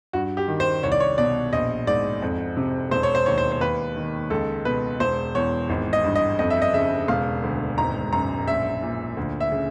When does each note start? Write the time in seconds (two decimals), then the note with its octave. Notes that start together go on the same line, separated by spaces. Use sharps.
0.13 G2 F#4
0.37 G4
0.48 D#3
0.60 C5
0.83 C2 C#5
0.92 D5
1.00 C#5
1.18 B2 D5
1.53 A#1 D#5
1.87 G#2 D5
2.22 F2
2.57 C3
2.91 E1 C5
3.03 C#5
3.15 C5
3.26 D#2 C#5
3.38 C5
3.52 C5
3.61 D#2 B4
3.96 D#3
4.30 C#2 A4
4.65 B2 B4
5.00 E1 C5
5.35 E2 C#5
5.70 G#1
5.93 D#5
6.04 G2
6.15 D#5
6.39 F2 D#5
6.50 E5
6.62 D#5
6.74 C#3 E5
7.08 E1 F5
7.43 D2
7.78 G#1 A#5
8.13 F#2 A#5
8.47 A#1 E5
8.83 A#2
9.17 D2
9.40 E5
9.52 C#3